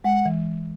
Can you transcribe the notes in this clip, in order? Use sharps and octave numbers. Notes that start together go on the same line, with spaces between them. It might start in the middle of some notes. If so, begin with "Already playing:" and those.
G#3 F#5
E3